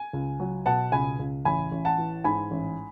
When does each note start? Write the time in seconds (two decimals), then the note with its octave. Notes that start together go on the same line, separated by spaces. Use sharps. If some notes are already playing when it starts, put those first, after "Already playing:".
Already playing: G#5
0.13 C#2
0.40 F#3
0.66 B2 F#5 A5
0.92 C#2 G#5 B5
1.19 C#2
1.45 A1 G#5 B5
1.72 A1
1.85 F#5 A5
1.98 E3
2.24 G#2 G#5 B5
2.51 A1